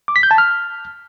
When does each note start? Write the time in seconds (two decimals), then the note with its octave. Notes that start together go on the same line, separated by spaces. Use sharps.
0.08 D6
0.16 B6
0.23 G6
0.31 A5
0.38 F6